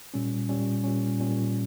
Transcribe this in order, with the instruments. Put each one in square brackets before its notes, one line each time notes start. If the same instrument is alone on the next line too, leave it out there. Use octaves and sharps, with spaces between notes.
[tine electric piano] A#2 G3 C#4
A#2 G3 C#4
A#2 G3 C#4
A#2 G3 C#4